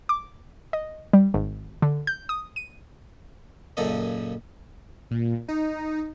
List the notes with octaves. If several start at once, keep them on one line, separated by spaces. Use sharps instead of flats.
D6
D#5
G3
G#1
D3
G6
D#6
D#7
F#2 A#2 C#3 A4 D#5
A#2
D#4